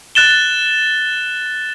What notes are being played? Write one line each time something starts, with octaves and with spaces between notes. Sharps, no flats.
F#6 A6 E7 G7